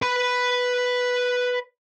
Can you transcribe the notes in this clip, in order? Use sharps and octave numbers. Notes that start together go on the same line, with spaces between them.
B4 B5